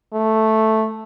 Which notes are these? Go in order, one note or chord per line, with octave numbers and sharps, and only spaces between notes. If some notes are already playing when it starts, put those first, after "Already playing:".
A3